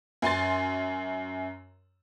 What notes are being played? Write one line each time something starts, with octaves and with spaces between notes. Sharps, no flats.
F#2 G#5 C6 A6